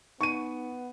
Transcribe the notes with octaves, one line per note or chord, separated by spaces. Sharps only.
B3 D#4 C#6 D#7